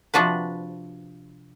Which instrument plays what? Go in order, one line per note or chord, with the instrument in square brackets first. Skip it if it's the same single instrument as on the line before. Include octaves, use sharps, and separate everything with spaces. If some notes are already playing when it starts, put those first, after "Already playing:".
[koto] C3 F3 D4 F#4 B4